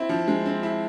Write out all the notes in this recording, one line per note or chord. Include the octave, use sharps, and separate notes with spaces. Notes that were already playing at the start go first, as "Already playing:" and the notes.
Already playing: C4 E4
F3
G#3
C4
E4